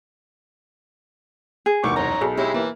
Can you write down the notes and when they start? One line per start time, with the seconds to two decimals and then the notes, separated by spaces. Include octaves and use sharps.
1.66 G#4
1.84 E1 C2 A3 B3 D#4 F#5 C#6 D6
1.96 F#2 C5 C#5 A#5
2.21 B1 G#4 A4
2.37 G#3 E4 G4 C#5 E5
2.54 E3 A#3